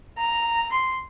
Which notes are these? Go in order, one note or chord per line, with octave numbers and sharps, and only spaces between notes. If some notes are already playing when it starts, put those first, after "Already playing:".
A#5
C6